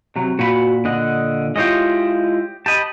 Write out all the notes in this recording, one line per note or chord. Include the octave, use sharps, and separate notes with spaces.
C3 F#3
A#2 F#4 B4 B5
D3 D#5 F#5
G#3 E4 F4 G4 C#5 D#5
G4 D#5 A5 B5